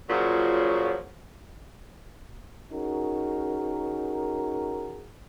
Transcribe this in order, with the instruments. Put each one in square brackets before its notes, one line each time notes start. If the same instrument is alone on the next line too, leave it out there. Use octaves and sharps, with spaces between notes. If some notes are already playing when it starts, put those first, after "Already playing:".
[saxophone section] A#2 C#3 F3 F#3
[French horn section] C#4 D#4 F#4 G#4 A#4